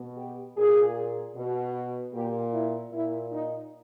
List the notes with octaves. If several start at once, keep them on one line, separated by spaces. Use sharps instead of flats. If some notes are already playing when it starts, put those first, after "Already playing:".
Already playing: B2
G4
A#2 G#4
B2
A#2 G4
E4
A#2 E4
D#4